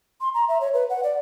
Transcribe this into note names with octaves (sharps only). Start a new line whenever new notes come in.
C6
A#5
E5
C#5
B4
F#5
D5